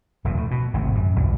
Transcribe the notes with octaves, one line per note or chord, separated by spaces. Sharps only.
F1 D#2 A#2
A2
B2
G#1 A2 C3
F#2
B1 E2 G2